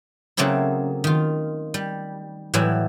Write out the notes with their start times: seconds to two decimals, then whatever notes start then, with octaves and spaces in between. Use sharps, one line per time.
0.37 C#3 F#3 A3 A#3 C4 E4
1.04 D#3 F4
1.74 G3
2.54 A2 E3 F#3 G3 E4